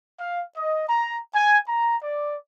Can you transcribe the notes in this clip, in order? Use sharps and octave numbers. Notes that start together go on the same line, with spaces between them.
F5
D#5
A#5
G#5
A#5
D5